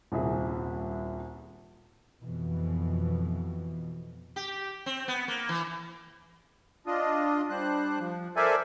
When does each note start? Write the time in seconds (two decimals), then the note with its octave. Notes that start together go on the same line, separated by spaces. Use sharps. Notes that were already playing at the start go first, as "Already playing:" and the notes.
0.12 D#1 C2 G#4 E5
2.23 F2 B2 E3
4.36 G4
4.86 C4
5.08 B3
5.28 A#3
5.49 E3
6.86 D4 F4 D#5
7.50 G3 D4 C5 F#6
7.99 F3
8.36 A4 A#4 C5 D5 E5 G#5